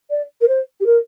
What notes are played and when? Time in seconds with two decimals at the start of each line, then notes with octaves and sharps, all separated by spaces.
0.10 D5
0.41 A#4
0.48 C5
0.80 G4
0.85 A#4